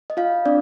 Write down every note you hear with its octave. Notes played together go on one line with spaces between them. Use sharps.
D#5
F4 F5
C4 D4 D5